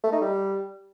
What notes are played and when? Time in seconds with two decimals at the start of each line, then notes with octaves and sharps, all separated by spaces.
0.04 A3
0.12 D#4
0.21 G3